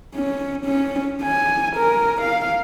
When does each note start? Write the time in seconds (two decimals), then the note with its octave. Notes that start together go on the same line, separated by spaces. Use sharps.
0.16 C#4
0.65 C#4
1.23 G#5
1.77 A#4
2.22 F5